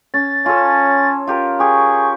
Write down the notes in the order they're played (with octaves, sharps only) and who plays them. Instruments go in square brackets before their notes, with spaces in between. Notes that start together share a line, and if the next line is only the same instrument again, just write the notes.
[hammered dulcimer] C#4 [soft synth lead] A6
[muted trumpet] C#4 [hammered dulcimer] F4 A4
[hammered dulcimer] F4 G4 A#4
[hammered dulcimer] G4 [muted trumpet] G#4 [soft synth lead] C#6